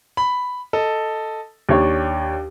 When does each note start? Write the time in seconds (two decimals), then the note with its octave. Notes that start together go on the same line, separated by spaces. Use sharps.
0.17 B5
0.73 A4 D#5
1.69 D#2 D4 C#5